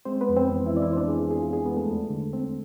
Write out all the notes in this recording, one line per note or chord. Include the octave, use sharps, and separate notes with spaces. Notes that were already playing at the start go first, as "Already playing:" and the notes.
G#3 C4 C5
B3 B4
F2
C4 C5
E3
E4 E5
E3 D5
E4 E5
C5
B3 D4 D5
G#4
B3 G#4
G#4
B3 F4
G#4
G#3 B3 B4
A3 A4
E2
D3
C4